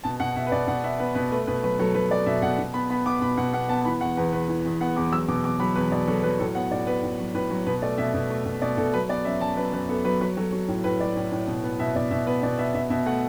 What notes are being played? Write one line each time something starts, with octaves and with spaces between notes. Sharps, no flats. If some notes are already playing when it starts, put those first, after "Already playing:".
B2 A5
B2 F#5
B2 E5
B4
B2 D5
B2 F#5
B3 E5
B3 B4
B2 B4
A3 B4
B2 B4
F#3 B4
F#3 A4
F#3 B4
F#3 D5
B2 E5
B2 F#5
B2
B3 B5
B3 B5
B3 D6
B2 B5
B2 F#5
B3 F#5
B3 A5
E3 B5
E2 F#5
E2 B4
E2 B4
E3
E2
B3 F#5
E2 D6
F#3 E6
B2 D6
E2 D6
F#3 B5
E2 B4
B2 D5
F#3 A4
F#3 B4
A2 A4
B3 F#5
A2 D5
B3 B4
A2
F#3
A2 B4
F#3
B2 B4
A3 D5
B2 E5
B2
A3
B2
B2 D5
B2 A4
F#3 B4
B3 D5
F#2 E5
F#2 A5
F#2 B4
F#2 B4
B3 A4
F#3 B4
F#3 B4
F#3 A4
F#3
A2
A2 B4
F#3 D5
A2
A2
B2
B3
B2 E5
B2 D5
B2 E5
B3 B4
B2 D5
B3 E5
B2 E5
B2 E5
A3 F#5